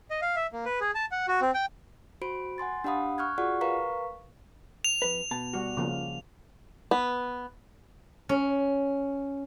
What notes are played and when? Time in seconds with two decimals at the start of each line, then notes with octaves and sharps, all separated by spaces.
0.11 D#5
0.22 F5
0.36 E5
0.52 A#3
0.65 B4
0.80 G#4
0.95 A5
1.11 F#5
1.28 F#4
1.41 C4
1.54 G5
2.22 F#4 C5 B5 D7
2.58 F#5 G#5 C6 A6
2.84 D4 G4 F5 F#5 B5 D#6
3.18 C#6 F6 F#6 G#6
3.38 F4 F#4 G#4 D5 F#5 C#6
3.61 A#4 B4 F5 A#5 C#6 B6
4.84 F7
5.02 F2 B4
5.31 B2 A5
5.53 G3 F#4
5.77 C#3 F3 A#3
6.91 B3
8.29 C#4